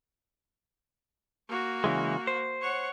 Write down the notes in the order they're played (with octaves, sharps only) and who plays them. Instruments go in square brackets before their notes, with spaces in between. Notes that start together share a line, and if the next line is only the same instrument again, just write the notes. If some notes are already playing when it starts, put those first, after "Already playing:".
[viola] A#3 F#4
[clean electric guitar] C#3 E3 G#3
C5
[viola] C#5 F#5